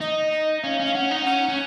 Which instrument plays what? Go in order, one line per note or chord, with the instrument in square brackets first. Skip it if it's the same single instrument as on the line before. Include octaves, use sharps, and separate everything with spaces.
[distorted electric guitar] D#4 [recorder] D#5
[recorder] D#5
[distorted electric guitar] C#4 [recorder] F5
[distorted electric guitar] C#4
[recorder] F5
[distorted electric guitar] C#4 [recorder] F#5
[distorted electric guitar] D#4
[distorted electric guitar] C#4 [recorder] F#5
[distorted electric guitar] C#4